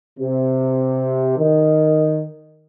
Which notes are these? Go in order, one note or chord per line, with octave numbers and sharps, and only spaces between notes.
C3
D#3